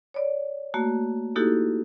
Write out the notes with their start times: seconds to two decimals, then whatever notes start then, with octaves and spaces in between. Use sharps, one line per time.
0.14 C#5 D5
0.74 A3 A#3 F#4
1.36 A#3 D#4 E4 F#4 G4 A4